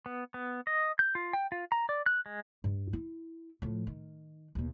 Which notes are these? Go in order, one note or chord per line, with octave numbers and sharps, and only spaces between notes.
B3
B3
D#5
G6
F4
G5
F4
A#5
D5
F#6
G#3
G2
E4
A2 F3
D#3
D#2 B2